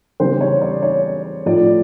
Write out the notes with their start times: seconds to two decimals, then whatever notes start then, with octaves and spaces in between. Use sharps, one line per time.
0.20 E2 C#3 E3 G3 C5
0.41 C#5
0.61 D5
0.82 C#5
1.46 A2 F3 D5